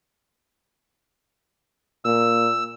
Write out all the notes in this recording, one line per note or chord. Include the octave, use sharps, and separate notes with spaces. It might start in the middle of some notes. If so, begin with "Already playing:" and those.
A#2 E6